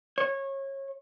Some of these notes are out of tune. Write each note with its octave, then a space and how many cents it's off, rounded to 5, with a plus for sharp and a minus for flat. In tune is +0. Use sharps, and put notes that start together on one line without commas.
C#5 -25